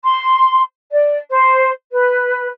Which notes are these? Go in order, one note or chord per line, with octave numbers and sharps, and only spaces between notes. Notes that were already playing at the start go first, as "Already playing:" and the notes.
C6
D5
C5
B4